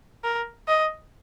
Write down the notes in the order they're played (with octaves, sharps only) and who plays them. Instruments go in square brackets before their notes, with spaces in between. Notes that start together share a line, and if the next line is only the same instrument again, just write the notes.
[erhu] A#4
D#5